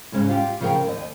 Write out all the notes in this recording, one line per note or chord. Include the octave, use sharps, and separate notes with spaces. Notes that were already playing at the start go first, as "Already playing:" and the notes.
G#2 C#3 G#3 C#4
F4 G4
C#3 F3 G#4 A#4 G5
D#2 D#5